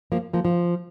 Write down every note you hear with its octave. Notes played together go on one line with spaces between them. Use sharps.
F3 A#3
F3 A#3
F3